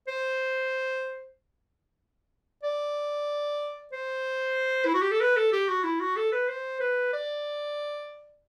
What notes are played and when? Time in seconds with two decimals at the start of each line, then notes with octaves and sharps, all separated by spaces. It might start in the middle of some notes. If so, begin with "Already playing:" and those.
0.08 C5
2.63 D5
3.93 C5
4.85 E4
4.94 F#4
5.02 G4
5.11 A4
5.20 B4
5.37 A4
5.53 G4
5.69 F#4
5.84 E4
6.00 F#4
6.17 A4
6.32 B4
6.49 C5
6.80 B4
7.13 D5